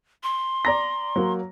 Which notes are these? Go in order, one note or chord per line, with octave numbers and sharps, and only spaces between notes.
C6
D5 A#5 A#6
F#3 A#3